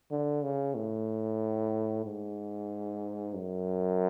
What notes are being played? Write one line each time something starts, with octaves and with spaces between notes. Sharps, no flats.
D3
C#3
A2
G#2
F#2